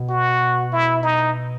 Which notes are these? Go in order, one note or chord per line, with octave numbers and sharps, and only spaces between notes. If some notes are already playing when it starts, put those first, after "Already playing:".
Already playing: B2
F#4
E4
D#4